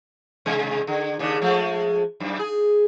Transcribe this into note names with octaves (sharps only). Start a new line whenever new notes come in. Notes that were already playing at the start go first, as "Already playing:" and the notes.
C3 G#3
D3
D#2 C#3 D4
F3 G#3 A3
F#2
G#4